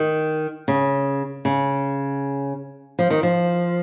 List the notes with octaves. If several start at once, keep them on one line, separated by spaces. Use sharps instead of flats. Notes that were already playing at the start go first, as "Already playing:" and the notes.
Already playing: D#3
C#3
C#3
F3
D#3
F3